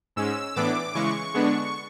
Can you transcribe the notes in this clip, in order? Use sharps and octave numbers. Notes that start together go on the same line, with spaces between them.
G#2 G#3 C#4 E6
A2 E3 B3 D4 D6
C#3 E3 G#3 C#6
D3 G#3 B3 D4